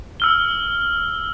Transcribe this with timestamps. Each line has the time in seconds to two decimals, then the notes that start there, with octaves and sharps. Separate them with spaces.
0.20 E6 F6 G7